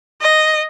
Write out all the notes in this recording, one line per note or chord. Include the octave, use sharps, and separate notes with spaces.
D#5